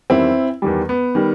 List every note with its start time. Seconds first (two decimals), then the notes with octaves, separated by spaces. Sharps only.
0.10 E2 D#3 G3 C4 E4
0.62 E2 D#3 G3
0.89 B3
1.15 D#3 G3